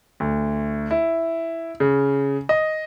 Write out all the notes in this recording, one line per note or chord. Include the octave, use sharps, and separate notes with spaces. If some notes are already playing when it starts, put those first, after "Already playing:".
D2
E4
C#3
D#5